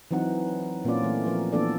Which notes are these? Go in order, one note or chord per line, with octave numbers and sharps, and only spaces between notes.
E3 F#3 C4 D#4 F#5
A#2 A#3 C4 C#4 F4 D5
E3 A3
F3 A#4
E3 A#3 B3 D4 A4 D5